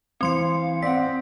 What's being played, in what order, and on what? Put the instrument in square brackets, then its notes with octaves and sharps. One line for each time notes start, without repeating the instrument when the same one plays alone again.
[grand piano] E3 C5 [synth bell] C4 C6 C#7 [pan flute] F5
[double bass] C4 [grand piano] D5 F#5 [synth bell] B6